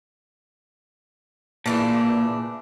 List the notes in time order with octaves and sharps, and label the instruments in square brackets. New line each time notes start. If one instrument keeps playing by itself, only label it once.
[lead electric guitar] A#2 [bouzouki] C#3 E3 D4